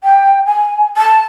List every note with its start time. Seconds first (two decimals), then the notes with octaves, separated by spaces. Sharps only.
0.04 G5
0.46 G#5
0.97 A5